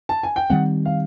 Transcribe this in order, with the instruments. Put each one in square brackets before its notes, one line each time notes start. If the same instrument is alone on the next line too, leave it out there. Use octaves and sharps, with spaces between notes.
[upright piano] A5
G#5
G5
[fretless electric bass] D#3 G3 C4 [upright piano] F#5
[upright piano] F5